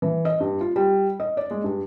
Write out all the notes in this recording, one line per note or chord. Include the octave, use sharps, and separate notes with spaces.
E3
D#5
G2
F4
G3
D#5
D5
G#3
G2